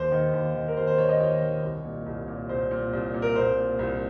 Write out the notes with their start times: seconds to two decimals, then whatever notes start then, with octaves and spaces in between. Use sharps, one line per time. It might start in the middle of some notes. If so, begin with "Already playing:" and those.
Already playing: D#2 C5
0.12 D#3
0.34 D#2
0.55 D#3
0.68 A#4
0.77 D#2 C5
0.87 C5
0.98 D#3 C#5
1.09 D#5
1.20 D#2 C#5
1.41 D#3
1.63 C2
1.85 A#2
2.06 C2
2.28 A#2
2.49 C2 C5
2.71 A#2
2.93 C2
3.14 A#2
3.22 A#4
3.36 C2 C5
3.57 A#2
3.79 C2